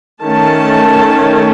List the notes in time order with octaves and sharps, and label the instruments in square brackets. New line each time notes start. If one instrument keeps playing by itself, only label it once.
[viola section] D#3 A3 C#4 A5